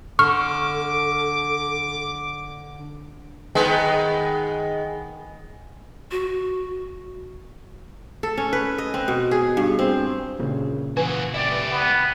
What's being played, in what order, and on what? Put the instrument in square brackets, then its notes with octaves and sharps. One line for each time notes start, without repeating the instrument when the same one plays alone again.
[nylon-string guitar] D3 [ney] A4 [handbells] C#6 F6 [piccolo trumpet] D6
[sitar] D#3 G#3 B3
[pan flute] F#4
[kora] A4
C#4
B4
D#5
C4
B2
G#4
G2
C4
[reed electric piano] A#2 C#3
[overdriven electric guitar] E3 F#4 [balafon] B4 G#5
[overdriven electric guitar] E4 G4 [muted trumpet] D5
[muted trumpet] B3